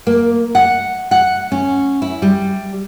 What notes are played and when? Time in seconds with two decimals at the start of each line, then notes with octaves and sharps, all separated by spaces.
0.07 A#3
0.55 F#5
1.11 F#5
1.52 C#4
2.02 E4
2.22 G3